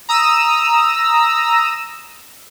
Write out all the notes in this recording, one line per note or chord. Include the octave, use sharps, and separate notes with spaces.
A#5 D#6 E6